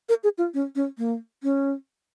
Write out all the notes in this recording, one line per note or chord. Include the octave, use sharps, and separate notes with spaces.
A#4
G#4
F4
C#4
C#4
A#3
C#4